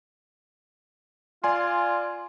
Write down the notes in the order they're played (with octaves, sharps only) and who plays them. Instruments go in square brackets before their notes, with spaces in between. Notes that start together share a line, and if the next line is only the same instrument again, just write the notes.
[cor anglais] F4 [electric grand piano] D5 G#5 C6